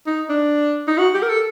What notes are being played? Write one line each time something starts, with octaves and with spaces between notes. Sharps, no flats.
D#4
D4
D#4
F#4
G4
A#4
A4